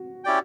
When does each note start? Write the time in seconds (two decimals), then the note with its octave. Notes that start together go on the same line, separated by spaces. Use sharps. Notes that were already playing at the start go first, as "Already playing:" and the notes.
Already playing: F#4
0.24 C#4 E4 G4 D5 G5